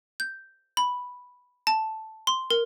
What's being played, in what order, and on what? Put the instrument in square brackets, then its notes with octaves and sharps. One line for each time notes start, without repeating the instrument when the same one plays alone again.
[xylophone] G6
B5
A5
C6
A#4